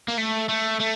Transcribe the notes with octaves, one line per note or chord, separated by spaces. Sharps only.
A#3
A3
A3
A3